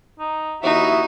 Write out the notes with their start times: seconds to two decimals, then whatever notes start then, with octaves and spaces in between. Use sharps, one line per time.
0.20 D#4
0.63 D#2 D#4 E4 F#4 D#5 E5